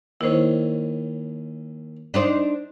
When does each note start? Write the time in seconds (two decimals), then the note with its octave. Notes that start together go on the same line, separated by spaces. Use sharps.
0.21 D#2 D#3 E4 C5 C#5
2.14 D4 D#4 C5